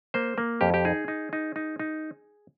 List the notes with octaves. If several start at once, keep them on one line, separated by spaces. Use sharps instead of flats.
A#3 C5
A#3
F2 G4
G4
D#4 G#4
D#4
D#4
D#4
D#4